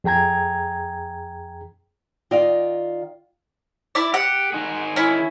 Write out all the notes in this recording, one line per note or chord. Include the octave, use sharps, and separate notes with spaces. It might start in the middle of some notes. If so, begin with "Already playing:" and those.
F2 G#4 G5 A#5 G#6
D#3 F4 D5 D#5 F5
E4 D5
G4 F#5
D#3 D#4 G#4
C#4 E4